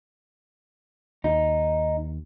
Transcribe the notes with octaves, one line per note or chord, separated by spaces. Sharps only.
D#2 D#4